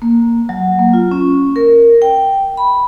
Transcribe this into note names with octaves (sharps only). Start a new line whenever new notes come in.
A#3
F#3
A#3
F4
C#4
A#4
G5
B5